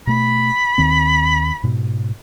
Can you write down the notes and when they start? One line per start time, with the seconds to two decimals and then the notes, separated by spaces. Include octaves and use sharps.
0.07 B2 A3 B5
0.78 D#2 D#3 C4
1.63 G#2 B2